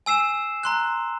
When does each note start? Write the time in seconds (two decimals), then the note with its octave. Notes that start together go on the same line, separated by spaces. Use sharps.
0.06 G#5 E6 C7 E7
0.63 A#5 C6 F#6